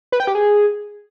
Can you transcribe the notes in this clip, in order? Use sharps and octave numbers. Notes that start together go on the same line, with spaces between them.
B4
G5
G4
G#4